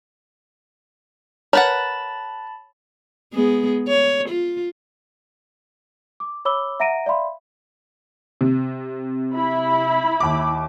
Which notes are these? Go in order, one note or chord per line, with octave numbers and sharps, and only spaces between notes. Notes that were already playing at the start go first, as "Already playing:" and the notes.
A#4 B4 C#5 F#5 A5 B5 A6
G#3 B3 G#4
C#5
F4
D6
C#5 B5 D6 E6 G7
E5 F#5 A#5 A#6 D7 D#7
D5 E5 F5 B5 C6
C3
E4 B5
D#2 D6